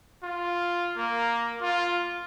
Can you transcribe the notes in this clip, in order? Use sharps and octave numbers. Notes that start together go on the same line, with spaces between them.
F4
A#3
F4